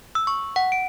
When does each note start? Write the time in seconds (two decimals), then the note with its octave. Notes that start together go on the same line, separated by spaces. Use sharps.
0.15 E6
0.27 C#6
0.56 F#5
0.72 D7